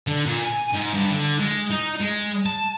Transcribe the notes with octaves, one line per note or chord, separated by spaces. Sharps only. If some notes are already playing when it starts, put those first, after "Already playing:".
D3
A#2
G#5
G#2
G2
D3
G#3
D#4
G#3
A5